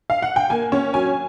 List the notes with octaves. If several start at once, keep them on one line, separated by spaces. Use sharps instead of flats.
F5
F#5
G5
A#3 G#5
C#4
F#3 G#5